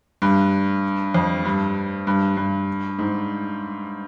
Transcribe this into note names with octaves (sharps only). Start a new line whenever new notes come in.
G2
F2
G2
G2
G2
G#2